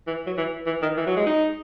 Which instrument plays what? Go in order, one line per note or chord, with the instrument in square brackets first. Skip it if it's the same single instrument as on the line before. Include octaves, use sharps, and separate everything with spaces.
[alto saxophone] E3
F#3
E3
E3
D#3
E3
F#3
G#3
D#4